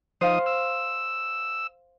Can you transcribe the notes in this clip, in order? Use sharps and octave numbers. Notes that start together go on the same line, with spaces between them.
F3 D#4 C5 F5 D#6
E6